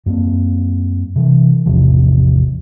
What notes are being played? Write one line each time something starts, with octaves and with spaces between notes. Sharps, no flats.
F#2 A#3 C4
C3 E3
A1 E2 C3 F3